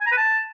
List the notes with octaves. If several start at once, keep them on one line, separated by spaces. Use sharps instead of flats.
G#5
A#5
B4
A5